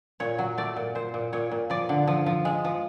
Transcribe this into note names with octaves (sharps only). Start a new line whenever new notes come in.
A#2 C#5
F#3
A3 D5
A#2
A#2 C5
A#2
A#2 C#5
A#2
F3 D5
D3
F3
F3
G#3
F3